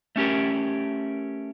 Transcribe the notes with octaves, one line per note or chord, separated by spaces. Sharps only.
A3 C#4 G4 A#4